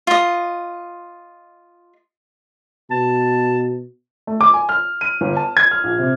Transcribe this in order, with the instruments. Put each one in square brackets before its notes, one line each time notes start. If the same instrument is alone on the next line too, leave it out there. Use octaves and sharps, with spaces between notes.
[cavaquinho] F4 D#5
[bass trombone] B2 [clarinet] A5
[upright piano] A3
D6
G#5
F6
D#7
G1
A5
G#6
F6
A#1
C3